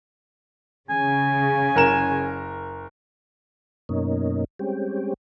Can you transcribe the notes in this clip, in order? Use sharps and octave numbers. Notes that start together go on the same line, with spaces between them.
C#3 G#5
F#1 A#4 E7
F#2 B2 A#3 C#4 D#4
G3 G#3 C4 C#4 G4